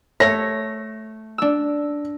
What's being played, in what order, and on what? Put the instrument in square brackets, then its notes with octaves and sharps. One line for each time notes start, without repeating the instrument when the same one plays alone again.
[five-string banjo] A3 C#5 [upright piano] A#6
[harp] D4 E6